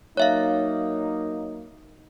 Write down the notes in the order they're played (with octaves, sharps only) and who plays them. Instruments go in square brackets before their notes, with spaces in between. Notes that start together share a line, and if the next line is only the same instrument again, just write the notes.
[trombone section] F#3 A#3 D#4 [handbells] C#5 E5 F5